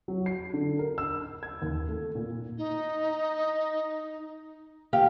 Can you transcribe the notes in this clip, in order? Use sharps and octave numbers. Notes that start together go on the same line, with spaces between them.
F#3
C7
D3
A#4
E6
G#6
D#2
A3
A#2
D#4
D#2 G4 F5